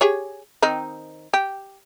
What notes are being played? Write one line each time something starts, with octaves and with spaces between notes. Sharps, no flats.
G4 G#4 C#5
D#3 C4 D#4
G4